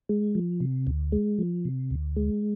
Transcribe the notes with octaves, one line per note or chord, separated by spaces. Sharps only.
G#3
F3
C3
D2
G#3
F3
C3
D2
G#3